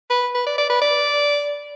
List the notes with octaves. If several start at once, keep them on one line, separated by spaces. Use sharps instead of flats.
B4
B4
D5
D5
B4
D5